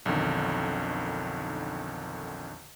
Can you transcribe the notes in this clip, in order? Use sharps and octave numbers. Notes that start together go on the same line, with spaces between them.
B1 F2 D3 D#3